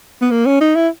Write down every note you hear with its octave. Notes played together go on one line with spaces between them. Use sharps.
B3
A#3
C#4
D#4
E4